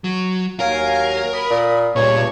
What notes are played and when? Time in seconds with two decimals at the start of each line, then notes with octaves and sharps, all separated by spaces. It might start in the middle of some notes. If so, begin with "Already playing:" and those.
0.04 F#3
0.60 D#2 F#3 A#4 F5 G#5
1.33 B5 D#6
1.50 A#2
1.96 C#2 G2 A#2 C#5 C#6